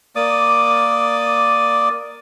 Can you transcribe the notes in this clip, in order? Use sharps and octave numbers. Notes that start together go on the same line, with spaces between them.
A#3 D5 D6 D#6